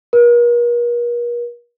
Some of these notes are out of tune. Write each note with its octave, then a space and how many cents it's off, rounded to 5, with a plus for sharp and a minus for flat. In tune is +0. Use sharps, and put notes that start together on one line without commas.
A#4 +45